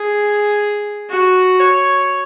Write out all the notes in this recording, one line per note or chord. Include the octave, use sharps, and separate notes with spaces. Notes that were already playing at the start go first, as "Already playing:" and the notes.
Already playing: G#4
F#4
C#5